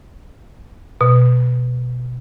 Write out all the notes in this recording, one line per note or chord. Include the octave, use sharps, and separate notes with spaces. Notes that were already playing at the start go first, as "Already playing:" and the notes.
B2